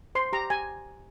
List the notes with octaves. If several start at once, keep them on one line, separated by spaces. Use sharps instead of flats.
C5 C6
G4 A#5
G4 G#5